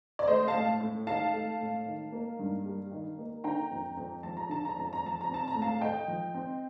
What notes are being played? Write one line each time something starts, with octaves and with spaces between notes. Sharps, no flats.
D5
A3 C5 D#5
F5 A5
A2
A2
D#4 F5 A5
A3
A2
D#3
A#3
G2
G3
D#3
A#3
D3 G5 A#5
F2
F2
F3 A5
A#5
D3 A5
A#5
F2 A5
A#5
F3 A5
A#5
C4
A5
A#5
A2
F5 A5
A3 D#5 G5
F3
C4